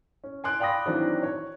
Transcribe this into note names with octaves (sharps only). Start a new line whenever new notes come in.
C#4
G#5 C6 F#6 D7
D5 F5 G5 B5 D#6 A#6
D#3 E3 F#3 C4 D4
C#5